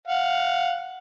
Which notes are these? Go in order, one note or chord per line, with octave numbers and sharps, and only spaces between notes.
F5 F#5